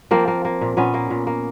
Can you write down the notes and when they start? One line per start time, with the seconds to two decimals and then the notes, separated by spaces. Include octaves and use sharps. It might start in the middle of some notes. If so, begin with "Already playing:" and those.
0.11 F3 A#3 C4
0.28 A#3
0.45 A#3
0.61 A#2
0.77 A#2 B3 C#4
0.94 A#3
1.10 A#2
1.27 A#3